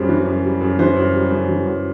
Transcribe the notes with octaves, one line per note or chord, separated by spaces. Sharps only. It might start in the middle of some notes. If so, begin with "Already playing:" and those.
Already playing: F#2 G3 C5
E3
F#2
G3
F#2
E3 C5
F#2
G3
F#2
E3
F#2